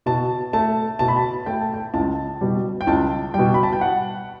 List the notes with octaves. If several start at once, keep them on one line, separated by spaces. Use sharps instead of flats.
B2 A5
A3 A5
B2 A5
B5
A5
A3 G5
A5
G5
C#2 A5
B2 G3
G5
C#2 A5
B2 G3 G5
B5
A5
G5
F#5